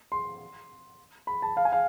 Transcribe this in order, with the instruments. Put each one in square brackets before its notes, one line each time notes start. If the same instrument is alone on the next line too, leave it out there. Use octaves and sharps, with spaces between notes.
[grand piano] C6
B5
A5
F5
G#5
F5